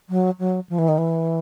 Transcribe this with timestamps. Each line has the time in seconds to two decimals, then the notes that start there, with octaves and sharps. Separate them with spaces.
0.10 F#3
0.39 F#3
0.69 F3
0.78 E3
0.88 D#3
0.98 E3